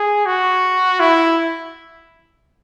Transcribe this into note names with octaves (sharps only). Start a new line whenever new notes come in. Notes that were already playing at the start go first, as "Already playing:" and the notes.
Already playing: G#4
F#4
E4